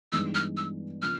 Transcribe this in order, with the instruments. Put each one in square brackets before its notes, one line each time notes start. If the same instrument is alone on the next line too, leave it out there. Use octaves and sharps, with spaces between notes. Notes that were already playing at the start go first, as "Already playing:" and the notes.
[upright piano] G2 E3 G#3 B3 D#4 [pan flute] E6
[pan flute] F6
E6
[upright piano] C#3 F3 A#3 [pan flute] F6